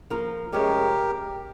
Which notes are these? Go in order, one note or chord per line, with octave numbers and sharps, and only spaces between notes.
F3 A#3 F4 A#4
F2 C3 F3 G#3 C#4 G4 A#4